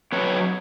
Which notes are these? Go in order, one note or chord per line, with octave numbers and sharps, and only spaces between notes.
B2 F#3 A3 C4 B4 C#5